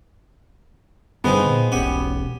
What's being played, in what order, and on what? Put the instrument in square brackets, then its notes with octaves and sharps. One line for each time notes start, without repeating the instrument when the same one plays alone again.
[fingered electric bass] G2 D3 [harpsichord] G#3 C4 D#4 [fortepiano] B3
[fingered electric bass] A#2
[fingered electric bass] E1 B1 C#4 [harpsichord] G4 F#5 G#5